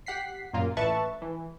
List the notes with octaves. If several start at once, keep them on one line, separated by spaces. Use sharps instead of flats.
G4 F#5 B6 C7
F#2 A#2 A#3 F4
A1 B4 E5 A5 C#6
E3